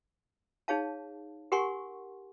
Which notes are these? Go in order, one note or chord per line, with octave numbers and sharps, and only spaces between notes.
D#4 G#4 C#5 F5 A5
G4 A#4 F#5 G#5 C6 C#6